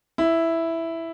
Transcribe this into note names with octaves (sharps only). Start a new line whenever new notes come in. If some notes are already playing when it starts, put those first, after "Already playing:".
E4